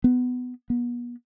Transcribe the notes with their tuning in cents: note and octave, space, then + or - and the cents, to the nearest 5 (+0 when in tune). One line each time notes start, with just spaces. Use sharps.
B3 +15
B3 -40